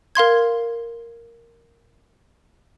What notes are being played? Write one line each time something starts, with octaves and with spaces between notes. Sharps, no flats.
A#4 F5 C6 G#6